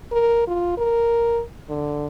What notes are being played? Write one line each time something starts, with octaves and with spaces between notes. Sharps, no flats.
A#4
F4
A#4
D3